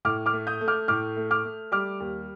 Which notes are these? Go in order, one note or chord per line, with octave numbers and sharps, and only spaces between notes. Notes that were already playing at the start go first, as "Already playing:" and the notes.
A2 D6 F6
D6 F6
A3
D#6 G6
A3
D6 F6
A2 D6 F6
A3
D6 F6
A3
G3 D6 F6
D#2